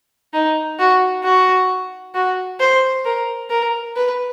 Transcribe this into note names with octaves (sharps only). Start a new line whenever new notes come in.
D#4
F#4
F#4
F#4
C5
A#4
A#4
B4